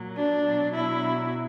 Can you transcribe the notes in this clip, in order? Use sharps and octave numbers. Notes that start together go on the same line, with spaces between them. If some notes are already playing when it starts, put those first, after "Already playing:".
Already playing: A#2 F#3
D4
B2 F#3
E4